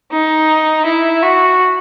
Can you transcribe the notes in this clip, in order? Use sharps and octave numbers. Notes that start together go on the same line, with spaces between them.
D#4
E4
F#4